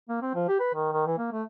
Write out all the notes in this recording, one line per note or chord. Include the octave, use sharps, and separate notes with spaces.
A#3
C4
F3
G4
B4
D#3
D#3
E3
A#3
A3